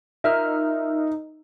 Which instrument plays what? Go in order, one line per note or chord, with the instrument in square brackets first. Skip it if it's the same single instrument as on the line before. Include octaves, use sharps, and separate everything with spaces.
[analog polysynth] D#4 [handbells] F4 A#4 F6 [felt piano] E5